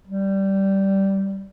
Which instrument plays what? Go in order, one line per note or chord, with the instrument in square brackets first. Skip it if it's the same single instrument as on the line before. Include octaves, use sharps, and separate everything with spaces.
[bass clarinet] G3